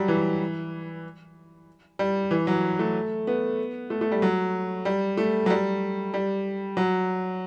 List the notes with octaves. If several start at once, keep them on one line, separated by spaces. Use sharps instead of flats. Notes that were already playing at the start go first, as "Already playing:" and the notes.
Already playing: F#3 G3
E3
G3
E3
F#3
A3
B3
A3
A3
G3
F#3
G3
A3
F#3
G3
G3
F#3